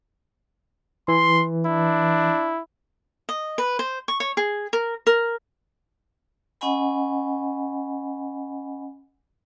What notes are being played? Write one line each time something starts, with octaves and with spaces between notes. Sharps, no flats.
E3 C6
D4 E4
D#5
B4
C5
C#6
C#5
G#4
A#4
A#4
C#4 D#5 F#5 G#5 B5